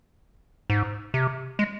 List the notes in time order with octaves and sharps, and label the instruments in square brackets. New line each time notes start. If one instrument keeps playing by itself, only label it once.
[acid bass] G#2
C3
G#3